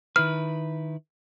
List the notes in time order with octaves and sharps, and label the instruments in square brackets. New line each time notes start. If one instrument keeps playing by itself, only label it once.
[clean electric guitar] D#3 E4 B4 [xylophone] F6